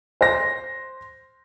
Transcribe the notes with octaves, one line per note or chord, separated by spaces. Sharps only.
C5 A#6